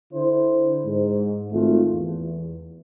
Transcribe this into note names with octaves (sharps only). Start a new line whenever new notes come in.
D3 E4 C5
G#2
G#1 A3 F4
E2